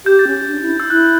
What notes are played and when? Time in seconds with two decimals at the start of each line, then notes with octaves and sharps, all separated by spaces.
0.05 G4 G6
0.19 A6
0.27 C#4
0.48 D4
0.62 E4
0.80 E6
0.90 E4 F#6